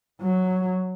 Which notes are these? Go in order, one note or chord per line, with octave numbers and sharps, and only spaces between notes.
F#3